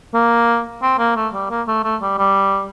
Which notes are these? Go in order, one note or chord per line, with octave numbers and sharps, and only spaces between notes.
A#3
C4
A#3
A3
G3
A#3
A3
A3
G3
G3